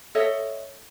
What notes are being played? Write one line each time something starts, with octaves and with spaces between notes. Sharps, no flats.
A4 C#5 D#5 E5